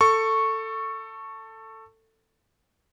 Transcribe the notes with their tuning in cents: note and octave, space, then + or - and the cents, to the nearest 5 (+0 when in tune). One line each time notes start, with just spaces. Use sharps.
A4 +15 C#6 -5